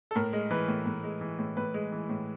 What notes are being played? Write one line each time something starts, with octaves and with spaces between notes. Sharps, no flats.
A4
A2 A#4
G#3
E3 B4
A2
A2
G#3
E3
A2
A2 B4
G#3
E3
A2